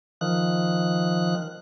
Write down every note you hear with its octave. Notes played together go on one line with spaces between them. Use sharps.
D#3 F3 F#6